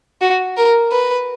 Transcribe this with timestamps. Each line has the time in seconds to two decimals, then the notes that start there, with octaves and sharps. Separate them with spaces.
0.21 F#4
0.57 A#4
0.92 B4